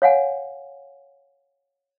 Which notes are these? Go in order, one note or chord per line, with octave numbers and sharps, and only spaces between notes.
C#5 F5 F#5 G#5